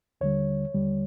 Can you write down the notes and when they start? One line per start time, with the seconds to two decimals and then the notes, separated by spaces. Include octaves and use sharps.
0.21 D#2 D3 G3 C#5
0.74 D#2 D3 G3